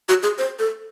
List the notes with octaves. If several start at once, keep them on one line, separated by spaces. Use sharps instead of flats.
F#4
G#4
C5
A4